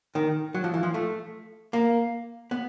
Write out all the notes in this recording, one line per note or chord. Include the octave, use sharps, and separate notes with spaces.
D#3
F#3
F3
E3
F3
A3
A#3
B3